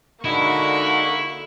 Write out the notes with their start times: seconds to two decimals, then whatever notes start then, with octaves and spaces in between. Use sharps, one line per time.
0.25 D3 G#3 A#3 D#4 E4 F#4 C#6